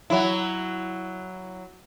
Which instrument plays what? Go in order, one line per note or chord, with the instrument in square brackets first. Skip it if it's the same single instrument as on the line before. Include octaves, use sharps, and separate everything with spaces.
[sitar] F#3 E4